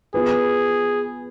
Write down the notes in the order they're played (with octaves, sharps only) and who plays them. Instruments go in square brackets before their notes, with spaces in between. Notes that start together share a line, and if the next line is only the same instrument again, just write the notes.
[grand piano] B3 F4 B4 [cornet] G#4